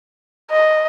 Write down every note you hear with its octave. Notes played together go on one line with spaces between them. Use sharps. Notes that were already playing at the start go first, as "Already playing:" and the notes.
D#5